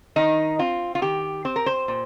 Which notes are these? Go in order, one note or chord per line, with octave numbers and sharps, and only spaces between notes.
D#3 D#4
C4 F4
F4
D#3 G4
C4 C5
A#4
C5
A#2